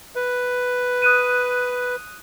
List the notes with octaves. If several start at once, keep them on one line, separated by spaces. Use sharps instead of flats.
B4
D#6 F#6 D#7